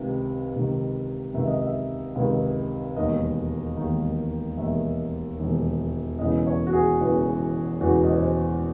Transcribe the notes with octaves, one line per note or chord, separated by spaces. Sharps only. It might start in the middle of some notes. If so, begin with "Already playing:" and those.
Already playing: C#2 C3 D#3
C#2 C3 D#3
C#2 C3 D#3 E5
D#5
E5
C#2 C3 D#3
E1 D#2 D#3 D#5
E1 D#2 D#3
E1 D#2 D#3 E5
E1 D#2 D#3
E1 E2 C#3 E3 D#5
C#5
F#4
G#4
E1 E2 C#3 E3
E1 E2 C#3 E3 F#4
D#5
C#5
C5